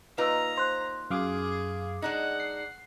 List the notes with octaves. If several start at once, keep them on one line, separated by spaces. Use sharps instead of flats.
A#2 D#4 F4 B4 A#5 E6
C5 C6 F#6
F#2 G#4 F5 D6
G#3 D4 D#4 F#5
C7